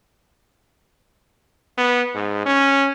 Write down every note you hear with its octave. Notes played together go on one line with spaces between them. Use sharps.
B3
G#2
C#4